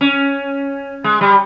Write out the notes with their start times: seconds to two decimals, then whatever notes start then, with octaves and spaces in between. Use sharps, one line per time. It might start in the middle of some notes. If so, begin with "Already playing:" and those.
0.01 C#4
1.04 G#3
1.21 G3